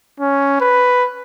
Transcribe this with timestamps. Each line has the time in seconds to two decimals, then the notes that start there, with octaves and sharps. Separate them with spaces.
0.20 C#4
0.61 B4